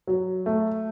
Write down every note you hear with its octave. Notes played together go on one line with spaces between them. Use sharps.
F#3
A3